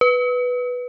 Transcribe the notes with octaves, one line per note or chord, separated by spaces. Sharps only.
B4